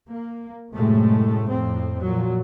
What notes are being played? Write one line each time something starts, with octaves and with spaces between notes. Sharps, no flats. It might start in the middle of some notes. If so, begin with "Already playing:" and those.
A#3
F#2 A2 C3 G#3 A3
F2 A2 C4
A#2 F3 F#3